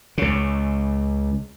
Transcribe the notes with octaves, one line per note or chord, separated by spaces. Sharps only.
C#2 C#3